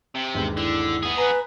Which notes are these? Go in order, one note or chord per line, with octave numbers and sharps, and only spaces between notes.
C3
G1 D#2 G#3
D3 E4 E6
B3 G#4
B4 G#5 A#5